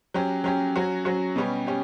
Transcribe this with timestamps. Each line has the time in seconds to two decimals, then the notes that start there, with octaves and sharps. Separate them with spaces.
0.14 F#3 C#4 G4
0.44 F#3 C#4 G4
0.76 F#3 C#4 F#4
1.05 F#3 C#4 F#4
1.36 B2 G3 C#4 G4
1.67 C#4 G4